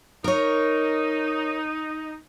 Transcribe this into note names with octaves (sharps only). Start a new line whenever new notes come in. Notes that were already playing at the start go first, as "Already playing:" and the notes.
D#4 A#4 C#5